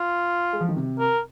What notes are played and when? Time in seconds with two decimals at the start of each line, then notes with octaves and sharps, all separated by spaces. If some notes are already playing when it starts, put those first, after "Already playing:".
Already playing: F4
0.53 G#3
0.61 F3
0.69 D#3
0.77 C3
0.99 A#4